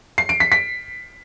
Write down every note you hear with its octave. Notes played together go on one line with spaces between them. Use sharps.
C7
D7
B6
B6